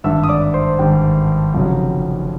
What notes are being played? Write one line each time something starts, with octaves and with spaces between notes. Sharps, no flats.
G#1 G2 D3 E5 E6
D#6
D5 D6
C5 C6
G#1 G2 D3 G4 G5
F1 F2 C#3 F#3